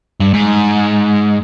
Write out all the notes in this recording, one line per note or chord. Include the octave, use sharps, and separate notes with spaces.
G2
G#2